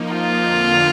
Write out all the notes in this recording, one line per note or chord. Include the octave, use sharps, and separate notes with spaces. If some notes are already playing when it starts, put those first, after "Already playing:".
Already playing: F3 A#3 D#4
F4
F2 D3 F3 A#3